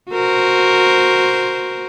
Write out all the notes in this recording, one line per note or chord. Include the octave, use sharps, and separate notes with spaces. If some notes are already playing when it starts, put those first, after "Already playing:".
F#4 A#4 C5